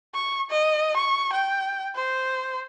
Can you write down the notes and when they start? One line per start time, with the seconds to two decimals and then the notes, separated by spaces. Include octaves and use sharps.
0.14 C#6
0.50 D#5
0.97 C#6
1.33 G5
1.95 C5